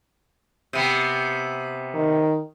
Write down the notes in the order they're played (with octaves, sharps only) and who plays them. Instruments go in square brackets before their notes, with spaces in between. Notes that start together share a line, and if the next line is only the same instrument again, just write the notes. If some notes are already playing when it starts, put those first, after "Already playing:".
[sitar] C3 B3
[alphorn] D#3